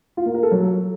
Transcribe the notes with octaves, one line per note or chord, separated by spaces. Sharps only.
F4
A#3
A#4
A4
F#3